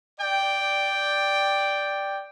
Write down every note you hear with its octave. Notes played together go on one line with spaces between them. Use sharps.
D5 G5